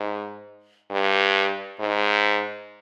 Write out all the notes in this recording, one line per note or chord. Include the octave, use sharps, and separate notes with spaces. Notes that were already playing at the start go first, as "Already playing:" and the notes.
Already playing: G#2
G2
G#2